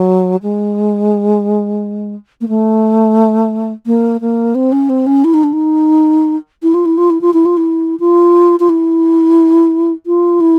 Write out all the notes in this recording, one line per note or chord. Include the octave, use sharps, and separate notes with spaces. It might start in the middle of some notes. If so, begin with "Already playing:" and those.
Already playing: F#3
G#3
A#3
A3
A#3
A#3
C4
C#4
C4
C#4
E4
D#4
D4
D#4
E4
F4
E4
F4
E4
F4
E4
F4
E4
F4
F4
E4
F4
E4